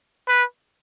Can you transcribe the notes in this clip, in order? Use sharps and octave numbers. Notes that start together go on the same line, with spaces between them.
B4